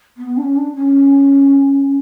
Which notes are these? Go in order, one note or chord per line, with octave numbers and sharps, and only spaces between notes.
B3
D4
C#4
D4
C#4